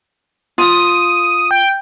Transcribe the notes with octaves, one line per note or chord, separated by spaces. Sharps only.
F4 D#6
G5